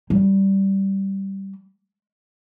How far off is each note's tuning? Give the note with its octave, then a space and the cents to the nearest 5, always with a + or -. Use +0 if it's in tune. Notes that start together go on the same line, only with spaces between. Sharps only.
G3 -10